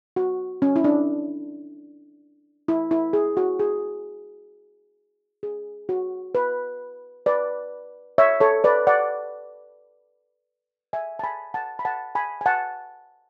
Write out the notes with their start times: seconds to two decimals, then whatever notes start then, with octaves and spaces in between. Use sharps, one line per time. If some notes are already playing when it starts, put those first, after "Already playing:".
0.16 F#4
0.62 C#4
0.76 E4
0.84 D4
2.68 E4
2.91 E4
3.13 G#4
3.37 F#4
3.59 G#4
5.43 G#4
5.89 F#4
6.35 B4
7.26 B4 D5
8.18 C#5 E5
8.40 A4 C#5
8.64 B4 D5
8.87 D5 F#5
10.93 E5 G#5
11.19 A5
11.24 G#5 B5
11.54 F#5 A5
11.79 B5
11.85 F#5 A5
12.15 G#5 B5
12.41 G#5
12.46 F#5 A5